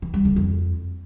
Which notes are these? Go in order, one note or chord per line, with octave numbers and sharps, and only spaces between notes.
E3
G3
D3
F2